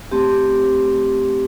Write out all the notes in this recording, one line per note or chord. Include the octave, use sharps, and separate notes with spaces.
A3 C4 G4